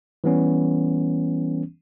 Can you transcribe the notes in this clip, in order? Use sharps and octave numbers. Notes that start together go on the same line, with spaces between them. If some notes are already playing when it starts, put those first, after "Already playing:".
E3 G3 B3 C#4